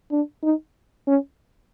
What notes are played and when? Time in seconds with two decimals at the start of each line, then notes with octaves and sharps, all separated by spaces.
0.11 D4
0.43 D#4
1.07 C#4